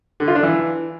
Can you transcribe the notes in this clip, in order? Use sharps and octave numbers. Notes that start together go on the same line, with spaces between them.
D3
F4
D4
E3